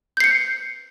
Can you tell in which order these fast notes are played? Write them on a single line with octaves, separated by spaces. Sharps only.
G6 C7 C#7